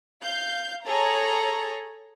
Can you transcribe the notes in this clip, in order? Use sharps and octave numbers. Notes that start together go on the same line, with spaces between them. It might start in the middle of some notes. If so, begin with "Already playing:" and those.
F5 G6
G#4 A4 C#5 A#5